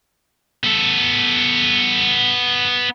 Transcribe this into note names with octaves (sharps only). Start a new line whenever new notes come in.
B3 A4